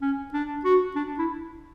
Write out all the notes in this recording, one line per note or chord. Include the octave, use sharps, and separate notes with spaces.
C#4
D4
F#4
D4
E4